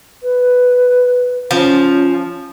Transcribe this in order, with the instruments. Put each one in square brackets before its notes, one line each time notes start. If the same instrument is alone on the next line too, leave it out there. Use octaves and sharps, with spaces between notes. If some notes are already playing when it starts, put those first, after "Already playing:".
[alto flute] B4
[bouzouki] F3 [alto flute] C#4